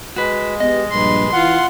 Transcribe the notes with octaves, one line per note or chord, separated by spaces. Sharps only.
G#3 F#4 B4
B3 G4 D#5
A#1 G2 B4 C6
E3 F4 F#5 C6